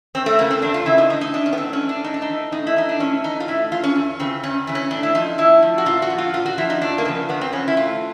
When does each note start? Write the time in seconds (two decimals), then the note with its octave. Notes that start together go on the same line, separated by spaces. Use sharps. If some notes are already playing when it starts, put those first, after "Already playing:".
0.15 E2 C4
0.26 A3
0.39 C#3 E3 A#3
0.50 C4
0.62 E2 D4
0.74 F4
0.86 C#3 E3 E4
0.98 D#4
1.10 A2 D#4
1.21 D#4
1.33 E3 D4
1.46 C#4
1.53 B3
1.57 A2 C4
1.73 C#4
1.82 E3
1.89 D4
2.04 A2 D#4
2.14 D4
2.22 D#4
2.29 E3
2.52 A2 D#4
2.67 E4
2.76 E3 D#4
2.89 D4
3.00 A2 C#4
3.24 E3 D#4
3.40 F4
3.48 A2 E4
3.72 E3 F4
3.84 C#4
3.95 E2
4.19 C#3 E3 C4
4.43 E2 C#4
4.67 C#3 E3
4.75 C#4
4.91 A2 D4
5.03 E4
5.15 F3 D#4
5.38 A2 E4
5.63 F3
5.78 F#4
5.86 A#2 F4
6.02 F#4
6.10 F3
6.18 F4
6.34 A#2 F4
6.46 F#4
6.58 F3 E4
6.70 D#4
6.81 E2 D4
6.98 A#3
7.05 C#3 F3 B3
7.29 E2 B3
7.41 C4
7.53 C#3 F3 C#4
7.68 E4
7.77 A2 F4